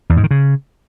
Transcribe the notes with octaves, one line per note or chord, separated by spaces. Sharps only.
E2
G#2
D#3
C#3